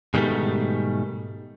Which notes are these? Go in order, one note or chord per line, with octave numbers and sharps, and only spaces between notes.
G#2 B2 D#3 F#3 G3 A3